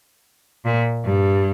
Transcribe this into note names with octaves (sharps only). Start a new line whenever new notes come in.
A#2
G2